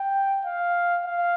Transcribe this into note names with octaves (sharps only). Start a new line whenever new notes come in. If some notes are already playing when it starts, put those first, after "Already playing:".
Already playing: G5
F5
F5